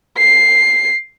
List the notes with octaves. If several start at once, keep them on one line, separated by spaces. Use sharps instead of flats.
C7